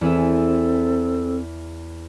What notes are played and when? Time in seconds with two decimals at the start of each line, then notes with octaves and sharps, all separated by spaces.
0.01 E2 C4 G#4 A4 E5